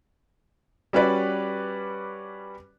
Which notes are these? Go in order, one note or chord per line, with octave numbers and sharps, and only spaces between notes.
G3 C#4 F#4 B4 D5